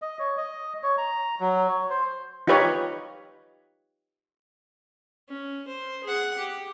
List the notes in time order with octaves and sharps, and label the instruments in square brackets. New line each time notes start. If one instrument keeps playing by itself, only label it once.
[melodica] D#5
C#5
D#5
C#5
A#5
F#3
C#5
C5
[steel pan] D#4 F4 G4 B4 C#5 D#5
[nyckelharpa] C#4
C5
G#4 F#5
G4